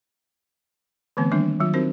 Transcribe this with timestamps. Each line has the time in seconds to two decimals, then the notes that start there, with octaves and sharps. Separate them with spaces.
1.17 D3 E3 A3 B3 C4
1.31 D#3 G3 A#3 D4
1.60 D#3 F#3 F4
1.74 C4 D#4 F#4 A#4 C5